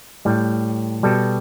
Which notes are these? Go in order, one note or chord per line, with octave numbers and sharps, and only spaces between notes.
A2 G3
B2 G3 A4